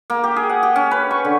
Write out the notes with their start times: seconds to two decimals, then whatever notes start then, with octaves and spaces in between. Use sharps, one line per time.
0.10 A#3
0.24 G4
0.36 G#4
0.49 F#5
0.63 G4
0.76 C#4
0.91 B4
1.11 C#6
1.25 D3